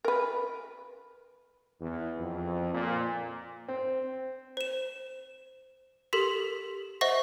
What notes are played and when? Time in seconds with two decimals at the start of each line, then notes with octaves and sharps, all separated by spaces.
0.05 A#4 B4
1.80 E2
2.19 F2
2.73 A#2
3.68 C4
4.57 C5 E7
6.13 G4 A4 A#4 C6 B6
7.01 C5 D#5 E5 F#5 C#6 A#6